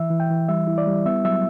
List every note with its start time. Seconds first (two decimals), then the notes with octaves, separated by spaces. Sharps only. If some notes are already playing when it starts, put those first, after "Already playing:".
Already playing: E3 E5
0.10 E3
0.20 G5
0.30 E3
0.48 G3 E5
0.67 E4
0.78 D5
0.87 G3
1.06 B3 E5
1.25 F#3 E5